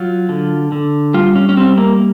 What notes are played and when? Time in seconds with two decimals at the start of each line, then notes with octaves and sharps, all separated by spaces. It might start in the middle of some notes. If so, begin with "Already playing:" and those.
Already playing: F#3 F4
0.29 D3
0.72 D3
1.14 G3 F4
1.35 C#4
1.49 C#4
1.57 G3 C4
1.78 A#3